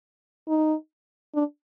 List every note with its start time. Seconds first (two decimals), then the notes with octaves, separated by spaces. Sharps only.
0.48 D#4
1.35 D4